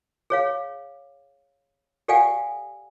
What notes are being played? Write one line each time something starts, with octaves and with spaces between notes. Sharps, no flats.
G#4 C#5 F5
G4 A4 D5 F5 F#5 G#5